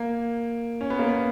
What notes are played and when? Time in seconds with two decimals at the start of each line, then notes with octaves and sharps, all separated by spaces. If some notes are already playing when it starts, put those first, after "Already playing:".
Already playing: A#3
0.81 C#4
0.90 B3
0.99 A#3
1.09 B3